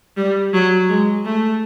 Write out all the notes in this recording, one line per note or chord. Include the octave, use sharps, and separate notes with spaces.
G3
F#3
G#3
A3